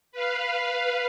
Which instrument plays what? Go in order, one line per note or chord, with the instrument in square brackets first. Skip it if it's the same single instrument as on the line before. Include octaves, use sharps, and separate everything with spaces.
[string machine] B4 F5